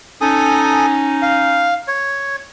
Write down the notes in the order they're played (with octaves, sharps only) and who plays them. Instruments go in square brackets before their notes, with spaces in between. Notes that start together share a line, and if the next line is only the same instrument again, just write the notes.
[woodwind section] C#4 D#4 [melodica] A4 G#5 D#6
[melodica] F5
C#5